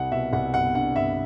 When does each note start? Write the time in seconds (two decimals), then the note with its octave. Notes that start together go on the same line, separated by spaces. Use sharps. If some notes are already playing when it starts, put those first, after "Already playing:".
Already playing: C2 F#5
0.12 B2 E5
0.33 C2 F#5
0.54 G1 F#5
0.74 G2 F#5
0.95 G1 E5